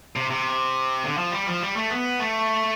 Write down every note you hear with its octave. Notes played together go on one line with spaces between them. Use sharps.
C3
C3
D3
F3
G3
F3
G3
A3
B3
A3